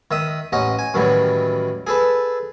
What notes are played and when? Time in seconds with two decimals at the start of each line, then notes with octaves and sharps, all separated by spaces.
0.11 D#3 E5 D#6
0.52 A1 C#4 D#5 F#5
0.79 G#5
0.94 F#2 A2 D#3 E3 F#3 G3
1.87 G#4 A4 B4